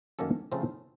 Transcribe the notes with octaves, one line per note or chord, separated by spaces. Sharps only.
F#2 D#3 A#3 C#4 A4
C#3 F3 A3 C4